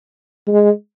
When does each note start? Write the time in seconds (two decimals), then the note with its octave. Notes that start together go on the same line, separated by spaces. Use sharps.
0.48 G#3